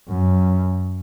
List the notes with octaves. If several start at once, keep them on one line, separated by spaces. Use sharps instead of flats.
F#2